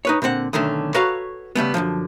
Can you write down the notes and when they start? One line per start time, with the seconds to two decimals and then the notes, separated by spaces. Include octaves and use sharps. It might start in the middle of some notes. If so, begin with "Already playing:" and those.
0.05 D#4 B4 C#5
0.22 A#2 D3 C4 F#5
0.53 B1 D3 D#3 A3 C#4
0.94 F#4 A4 B4 C#5 F5 A#5
1.56 C#3 G3 A3 B3
1.74 F#2 A#2 D3 F3